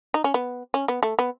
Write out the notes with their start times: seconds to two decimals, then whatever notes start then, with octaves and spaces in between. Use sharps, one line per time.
0.14 D#4
0.24 C#4
0.34 B3
0.74 C#4
0.88 B3
1.03 A3
1.19 B3